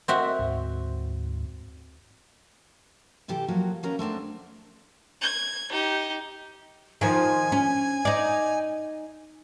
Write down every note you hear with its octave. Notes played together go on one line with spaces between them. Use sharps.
C4 F#4 A#4 D#5 E5 F#5
D2 G#2
C3 E3 G4 A4 A5
F3 F#3 A#3 F#4
D#2 B3 C#4 A#4 B4 A#5
A3 C4 D4 F#4
G#6
D#4 G4
D#3 F3 G#5
C#4
D#4 D5